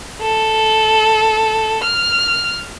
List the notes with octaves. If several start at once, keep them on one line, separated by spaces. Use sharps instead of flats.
A4
F6